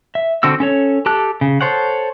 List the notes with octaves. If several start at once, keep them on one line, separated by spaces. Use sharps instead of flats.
E5
D3 C4 F#4 E6
C#4 A4 C#5
G4 A4 A5 F#6
C#3
A4 C5 C#5 F#5